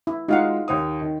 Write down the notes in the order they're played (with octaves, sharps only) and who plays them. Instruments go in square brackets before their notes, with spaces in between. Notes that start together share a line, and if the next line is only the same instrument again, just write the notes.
[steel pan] E4
[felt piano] G#3 F4 F#4 [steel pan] D#4 F5 F#5
[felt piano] D#2 C#5 D#6
D#3